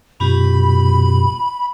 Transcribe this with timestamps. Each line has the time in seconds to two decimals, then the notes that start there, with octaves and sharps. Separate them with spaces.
0.20 F#2 B2 C#4 F4 G4 B5